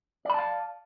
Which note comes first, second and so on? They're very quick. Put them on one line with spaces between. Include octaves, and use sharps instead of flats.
D5 B5 A5 F5